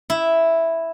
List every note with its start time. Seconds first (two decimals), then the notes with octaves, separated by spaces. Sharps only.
0.10 E4